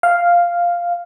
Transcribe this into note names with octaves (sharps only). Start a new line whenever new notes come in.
F5